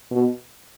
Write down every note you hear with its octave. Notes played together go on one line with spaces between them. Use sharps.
B2